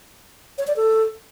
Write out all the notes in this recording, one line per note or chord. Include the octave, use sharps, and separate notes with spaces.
C#5
D5
A4